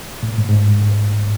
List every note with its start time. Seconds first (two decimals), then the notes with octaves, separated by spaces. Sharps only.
0.23 A2
0.38 G#2
0.48 G#2